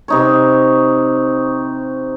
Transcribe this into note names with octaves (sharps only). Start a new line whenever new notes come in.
C3 D#4 C#5